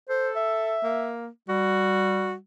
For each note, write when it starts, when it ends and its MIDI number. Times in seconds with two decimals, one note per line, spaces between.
0.09 0.76 69
0.09 0.30 72
0.36 1.10 76
0.83 1.28 58
1.49 2.39 55
1.49 2.34 66